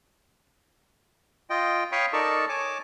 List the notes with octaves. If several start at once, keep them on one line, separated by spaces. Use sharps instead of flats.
F4 D#5 G5
C#5 F5 G5 B5 C#6 D#6
D#4 A4 A#4 D5 A5 C#6
C#5 G#5 A5 D6